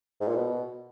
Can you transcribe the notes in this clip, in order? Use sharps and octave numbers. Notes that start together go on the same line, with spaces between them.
G#2
A#2
B2